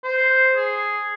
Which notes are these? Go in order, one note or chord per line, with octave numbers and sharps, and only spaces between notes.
C5
G#4